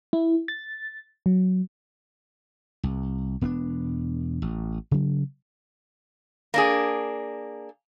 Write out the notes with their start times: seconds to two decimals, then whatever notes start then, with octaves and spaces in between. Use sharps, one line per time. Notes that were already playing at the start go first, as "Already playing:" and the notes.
0.13 E4
0.48 A6
1.26 F#3
2.84 C2
3.41 E1 B3 C#4 D4
4.42 A1
4.91 C#3 F#3
6.54 A#3 D4 G#4